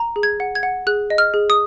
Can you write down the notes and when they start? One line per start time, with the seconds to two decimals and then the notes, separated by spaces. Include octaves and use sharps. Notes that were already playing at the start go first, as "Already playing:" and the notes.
Already playing: A#5
0.16 G#4
0.23 G#6
0.40 F#5
0.55 G#6
0.63 F#5
0.87 G#4 F#6
1.10 D#5
1.18 F6
1.34 G#4
1.50 D#6